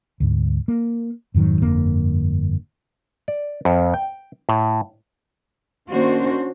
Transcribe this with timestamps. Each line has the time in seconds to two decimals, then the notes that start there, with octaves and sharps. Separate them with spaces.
0.20 D2 G#2
0.68 A#3
1.34 F2 G#2 D#3 F#3
1.61 G1 F2 D3 A#3
3.28 D5
3.65 F2
3.94 G5
4.49 A2
5.90 D#3 A#3 C#4 D4 F#4 C5